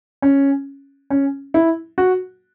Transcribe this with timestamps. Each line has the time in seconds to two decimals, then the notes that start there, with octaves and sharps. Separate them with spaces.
0.22 C#4
1.10 C#4
1.54 E4
1.98 F#4